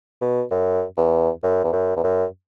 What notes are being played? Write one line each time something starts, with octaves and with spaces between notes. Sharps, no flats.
B2
F#2
E2
F#2
E2
F#2
E2
F#2